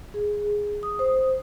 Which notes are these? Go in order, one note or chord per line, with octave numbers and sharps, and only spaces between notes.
G#4
D#6
C5